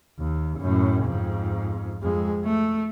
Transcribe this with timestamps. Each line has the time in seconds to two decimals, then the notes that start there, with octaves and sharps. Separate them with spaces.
0.19 D#2
0.59 F#2 A2
1.04 F2 G#2
2.02 F2 G#3
2.44 A3